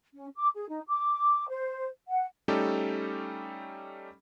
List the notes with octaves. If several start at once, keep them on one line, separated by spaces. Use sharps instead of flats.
C#4
D6
G#4
D#4
D6
C5
F#5
G3 A3 C#4 D#4 G4 A4